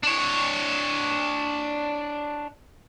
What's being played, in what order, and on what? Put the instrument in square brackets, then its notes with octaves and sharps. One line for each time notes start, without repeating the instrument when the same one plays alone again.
[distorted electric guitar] D4 C#5